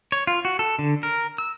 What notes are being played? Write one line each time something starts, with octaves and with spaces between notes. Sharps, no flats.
C#5
F4
F#4
A4
D3
A#4
E6